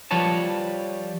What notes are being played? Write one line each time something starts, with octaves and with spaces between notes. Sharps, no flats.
F3 G3 B4 C#5 A5